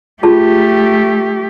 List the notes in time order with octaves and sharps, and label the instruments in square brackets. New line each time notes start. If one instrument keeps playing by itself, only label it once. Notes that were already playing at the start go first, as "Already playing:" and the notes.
[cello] A3 G4 [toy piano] F4 G#4 A5